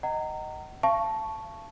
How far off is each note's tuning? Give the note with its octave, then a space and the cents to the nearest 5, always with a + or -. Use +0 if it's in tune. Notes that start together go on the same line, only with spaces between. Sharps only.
D#5 +0 F#5 +40 A#5 -20
F5 -40 A5 -5 C#6 +0